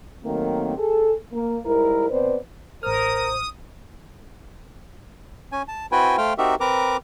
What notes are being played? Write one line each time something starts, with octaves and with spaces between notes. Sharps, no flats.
D#3 F#3 A3 A#3 C4
G#4 A4
A#3
G#2 G3 E4 A#4
B2 C4 B4 C5 D5
A1 A#4 C5 D#6 F6
C#4 G#5
A5
C4 E4 F#4 B4 G5 G#5
A3 C5 F5 G5
C4 D#4 F#4 G4 A#4 E5
C4 A#4 B4 A#5 D6